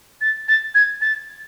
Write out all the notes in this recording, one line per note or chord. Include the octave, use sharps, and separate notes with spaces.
A6
A6
G#6
A6